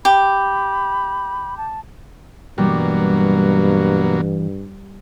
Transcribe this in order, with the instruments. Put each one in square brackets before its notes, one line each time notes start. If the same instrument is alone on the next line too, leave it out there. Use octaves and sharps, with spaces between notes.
[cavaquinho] G4 [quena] B5
[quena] A5
[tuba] G2 [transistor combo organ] B2 F#3 A#3 [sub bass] E3 [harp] G3